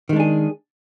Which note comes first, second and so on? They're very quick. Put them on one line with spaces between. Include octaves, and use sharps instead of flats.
D#3 G#3 D4 G#4